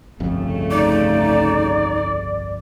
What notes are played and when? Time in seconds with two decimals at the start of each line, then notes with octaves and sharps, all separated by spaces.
0.20 G1 C2 F2 C#3 G3 A3
0.71 D#4 D5